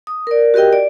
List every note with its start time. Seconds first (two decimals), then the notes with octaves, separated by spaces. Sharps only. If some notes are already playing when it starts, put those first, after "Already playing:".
0.07 D#6
0.27 A#4 D5
0.54 F#4 G4 A#4 D#5 G5
0.73 D5